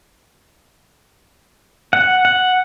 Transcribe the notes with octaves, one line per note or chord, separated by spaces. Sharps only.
F#5
F#5